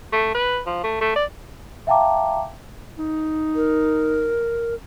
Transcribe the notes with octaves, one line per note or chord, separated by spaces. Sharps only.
A3
B4
F3
A3
A3
D5
E5 F5 G5 A5 A#5 D6
D#4
A#4